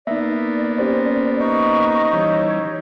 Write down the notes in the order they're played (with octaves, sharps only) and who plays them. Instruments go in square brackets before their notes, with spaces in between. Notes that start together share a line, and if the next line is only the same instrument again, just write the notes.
[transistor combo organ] A#3 B3 [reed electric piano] D#4 E5 [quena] D5
[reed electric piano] C#4 G4 C5
[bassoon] D#4 [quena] C#6
[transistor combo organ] E3 G3 [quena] C#5